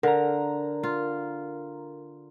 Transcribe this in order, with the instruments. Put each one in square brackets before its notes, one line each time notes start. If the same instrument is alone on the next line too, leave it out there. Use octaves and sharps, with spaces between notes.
[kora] D3 [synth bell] A#4 A#5
[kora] F4